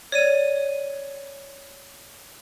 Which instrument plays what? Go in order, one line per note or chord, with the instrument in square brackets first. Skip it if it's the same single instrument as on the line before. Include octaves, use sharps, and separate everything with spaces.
[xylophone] C#5 D5 D#7